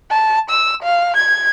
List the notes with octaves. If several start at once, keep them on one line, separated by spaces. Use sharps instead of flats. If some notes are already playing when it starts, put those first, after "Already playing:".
A5
E6
F5
G#6